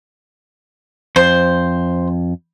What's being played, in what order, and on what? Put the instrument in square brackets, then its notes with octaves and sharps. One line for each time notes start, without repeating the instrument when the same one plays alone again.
[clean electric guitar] F2 [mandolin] C5